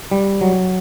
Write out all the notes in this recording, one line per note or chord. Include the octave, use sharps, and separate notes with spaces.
G3
F#3